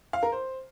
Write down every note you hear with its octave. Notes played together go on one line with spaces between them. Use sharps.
F5
A#4
C5